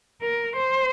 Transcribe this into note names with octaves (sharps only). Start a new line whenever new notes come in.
A#4
C5